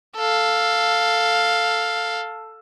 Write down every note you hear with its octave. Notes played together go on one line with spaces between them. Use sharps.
A4 F5